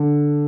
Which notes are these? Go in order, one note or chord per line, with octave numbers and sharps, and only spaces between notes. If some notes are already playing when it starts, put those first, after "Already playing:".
Already playing: D3